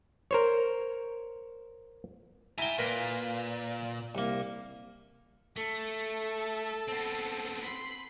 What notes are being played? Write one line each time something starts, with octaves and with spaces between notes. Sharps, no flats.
A#4 C5 C#5
E4 G5 G#5 A#5
A#2 F4 A#4 B4
C2 A#3
A3 A4
B3 C4
B5 C6